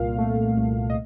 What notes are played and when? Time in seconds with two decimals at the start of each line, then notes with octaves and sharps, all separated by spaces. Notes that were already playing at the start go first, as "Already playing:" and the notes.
Already playing: C2 A#2 F5
0.18 A3
0.57 C2
0.90 D#5